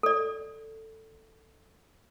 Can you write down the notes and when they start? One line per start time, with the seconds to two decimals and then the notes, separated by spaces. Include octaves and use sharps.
0.03 A4 D5